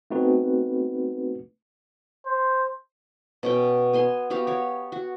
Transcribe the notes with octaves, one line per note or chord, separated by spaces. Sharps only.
A3 B3 C4 D#4 F#4 B4
C5
B2 C#4 G5
B3 G#5 C6
B3 F#4 G4 F5
G4 C#5
F#4